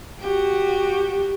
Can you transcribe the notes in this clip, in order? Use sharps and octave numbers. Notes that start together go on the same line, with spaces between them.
F#4 G4